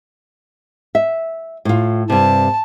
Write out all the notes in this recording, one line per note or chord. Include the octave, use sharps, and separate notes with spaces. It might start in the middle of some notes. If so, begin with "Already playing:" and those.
E5
A2 F4
G2 C3 A5